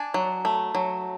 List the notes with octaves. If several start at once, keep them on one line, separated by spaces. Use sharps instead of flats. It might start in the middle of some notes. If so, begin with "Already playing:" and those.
Already playing: D4 G#5
F#3
A3
F#3